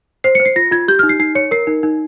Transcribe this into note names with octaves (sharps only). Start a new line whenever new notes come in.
C5 C7
C#7
C5
C7
F4 A#6
F4 G#6
G4 G6
F6
D#4
C7
D#4 C7
C#5 C#7
A#4 C7
D#4
D#4